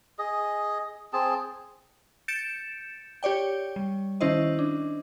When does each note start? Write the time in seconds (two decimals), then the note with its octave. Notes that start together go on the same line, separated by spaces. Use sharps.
0.19 G#4 D#5
1.13 C4 G#4 A5
2.28 G6 A6 C#7 D7 E7
3.23 G4 C#5 D5 G5
3.76 G3
4.21 D#3 C#4 E4 C5 D#5
4.59 D4